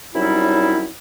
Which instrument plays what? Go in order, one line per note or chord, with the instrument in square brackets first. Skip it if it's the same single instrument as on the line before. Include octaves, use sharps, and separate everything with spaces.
[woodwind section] F#2 C3 F#3 G3 D#4 E4